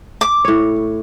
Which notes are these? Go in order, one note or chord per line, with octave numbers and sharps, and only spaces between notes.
D6
A2 C#5